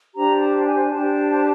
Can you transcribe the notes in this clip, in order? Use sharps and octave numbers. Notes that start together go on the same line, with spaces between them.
D4 G4 C5 A#5
A5
G#5
D4 G4 C5 A5